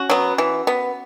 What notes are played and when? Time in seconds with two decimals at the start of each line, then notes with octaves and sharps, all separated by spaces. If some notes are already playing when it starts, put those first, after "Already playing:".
Already playing: C#4 F#4
0.10 F#3 B3
0.38 E3
0.67 B3